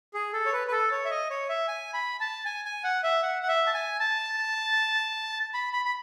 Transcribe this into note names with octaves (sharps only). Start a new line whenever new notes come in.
G#4
A4
C#5
B4
B4
A4
C#5
E5
D#5
C#5
E5
G#5
B5
A5
G#5
G#5
F#5
E5
F#5
F#5
E5
A5
G#5
A5
B5
B5
B5